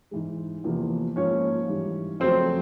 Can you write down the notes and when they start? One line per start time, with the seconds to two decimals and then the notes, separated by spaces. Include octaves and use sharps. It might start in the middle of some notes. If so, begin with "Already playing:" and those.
0.11 G#2 E3 G#3
0.64 E2 C3 F3 A#3
1.16 G#2 F3 A#3 C#4 C#5
1.68 G#2 E3 G3
2.20 F2 C#3 F#3 A3 C4 C5